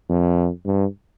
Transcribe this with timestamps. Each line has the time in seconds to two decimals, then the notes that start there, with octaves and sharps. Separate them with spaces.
0.09 F2
0.65 G2